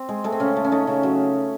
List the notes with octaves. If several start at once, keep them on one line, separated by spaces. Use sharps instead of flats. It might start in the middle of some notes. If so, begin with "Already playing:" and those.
Already playing: C4
G#3
G#3 A3
C4
C#3 C#4
A3
C#4
A3 D#4
C#3
F#3